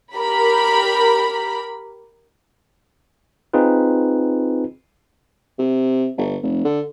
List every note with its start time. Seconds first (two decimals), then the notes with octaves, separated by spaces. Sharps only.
0.16 G4 A#4 B5
3.54 C4 D#4 F4 G#4 B4
5.59 C3
6.18 G1
6.43 F1
6.65 D3